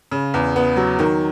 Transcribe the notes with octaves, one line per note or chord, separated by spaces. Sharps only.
C#3
E2
B3
F#3
D#3